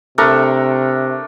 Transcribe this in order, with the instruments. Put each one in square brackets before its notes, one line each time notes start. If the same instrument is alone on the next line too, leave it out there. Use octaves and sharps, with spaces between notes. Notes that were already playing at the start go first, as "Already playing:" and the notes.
[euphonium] C3 [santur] A3 D4 A#4